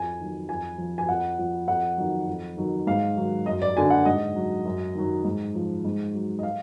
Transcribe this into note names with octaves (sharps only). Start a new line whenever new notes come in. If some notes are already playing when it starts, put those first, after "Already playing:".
Already playing: F2 G#5
D#3 F#3
F2 G#5
F3
G#5
F2 F#5
F3
F2 F#5
D#3 F#3
F2
D#3 F#3
G#2 F5
D#3 F#3
F#2 D#5
D5
D3 F#3 G#5
F#5
G#2 D#5
F#3
F#2
D#3 F#3
G#2
F3
G#2
F#3
D#5
F5